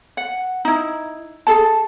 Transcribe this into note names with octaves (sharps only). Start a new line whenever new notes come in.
F#5
D#4 E4
G#4 A4 A5